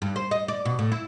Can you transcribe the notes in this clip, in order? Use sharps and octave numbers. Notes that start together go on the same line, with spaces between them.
G2
C5
D#5
D5
B2
A2
E4